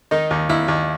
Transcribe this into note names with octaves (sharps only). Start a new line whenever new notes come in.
D#3 D#4
D#2
D#2 E4
D#2